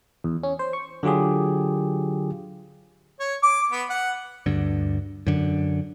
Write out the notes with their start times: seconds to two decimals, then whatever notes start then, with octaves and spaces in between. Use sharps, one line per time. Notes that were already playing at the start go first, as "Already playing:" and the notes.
0.24 E2
0.43 C#4
0.59 C5
0.73 C#6
1.03 D3 F#3 F4 G4 G#4
3.20 C#5
3.43 D6
3.72 B3
3.90 F#5
4.46 D2 G2 D3
5.27 F#2 D3